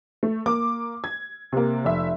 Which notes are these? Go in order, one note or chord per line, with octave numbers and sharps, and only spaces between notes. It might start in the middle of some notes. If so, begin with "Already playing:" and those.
A3
A#3 D6
G#6
C3 A#3
F1 E5